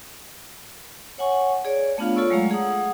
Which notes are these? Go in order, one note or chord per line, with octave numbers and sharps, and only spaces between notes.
C#5 F#5 G#5 C#6
G#4 C#5 D5
A3 B3 D4 F4 F5
F4 A4 C#5 D5 C#6 E6
F#3 G#3 A3 F5 A#5
G#4 F#5 D#6